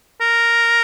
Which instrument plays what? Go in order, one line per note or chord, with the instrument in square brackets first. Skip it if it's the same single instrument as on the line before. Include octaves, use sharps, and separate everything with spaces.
[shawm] A#4